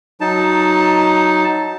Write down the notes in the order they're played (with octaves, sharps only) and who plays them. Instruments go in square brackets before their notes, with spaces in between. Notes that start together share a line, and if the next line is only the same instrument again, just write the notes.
[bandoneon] F#3 D#4 A5